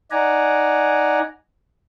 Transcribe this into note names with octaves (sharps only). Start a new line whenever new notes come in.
D#4 D5 F#5 G#5 A#5